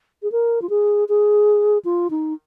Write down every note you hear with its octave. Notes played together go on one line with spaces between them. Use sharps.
G#4
A#4
F4
G#4
G#4
F4
D#4